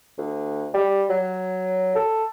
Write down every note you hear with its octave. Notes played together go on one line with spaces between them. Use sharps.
D2
G3
F#3
A4